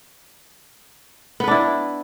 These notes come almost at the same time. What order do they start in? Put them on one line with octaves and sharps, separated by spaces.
B3 B4 D4 E4